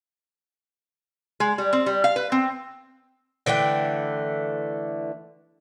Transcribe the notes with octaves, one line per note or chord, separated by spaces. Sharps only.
G#3
G3
C4
G3
F5
B4
C4
D3 E3 A3 G5